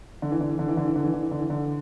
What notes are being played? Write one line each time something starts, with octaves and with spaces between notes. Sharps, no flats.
D3
E3
D3
E3
D3
E3
D3
E3
D3
E3
D3
E3
D3
E3
D3